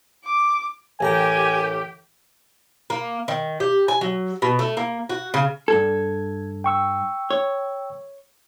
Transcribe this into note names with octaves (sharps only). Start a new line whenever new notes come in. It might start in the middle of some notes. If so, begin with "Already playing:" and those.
D6
A1 G4 A#4 G#5 A#5
A#3
D#3
G4
G#5
F#3
B2
A3
A#3
F#4
C#3
G2 A4 G#6
G5 C#6 E6
C#5